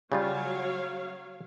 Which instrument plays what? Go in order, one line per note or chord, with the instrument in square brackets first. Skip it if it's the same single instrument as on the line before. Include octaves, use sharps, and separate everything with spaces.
[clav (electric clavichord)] C#3 G3 F4 [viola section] F#3 C#5 F5